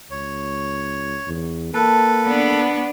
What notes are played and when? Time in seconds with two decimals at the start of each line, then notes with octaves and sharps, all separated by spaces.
0.11 C#2 C#5
1.27 E2
1.74 A#3 A4 B4 A5
2.26 B3 D4